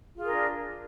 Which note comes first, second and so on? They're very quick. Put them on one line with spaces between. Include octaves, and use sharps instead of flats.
F4 G#4 A#4 D4